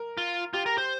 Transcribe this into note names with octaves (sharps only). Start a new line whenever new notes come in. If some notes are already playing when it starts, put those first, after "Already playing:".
Already playing: A#4
F4
F4 G4
A#4
C5